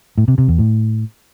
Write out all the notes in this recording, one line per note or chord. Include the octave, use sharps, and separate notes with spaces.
A2
C3
C3
E2
A2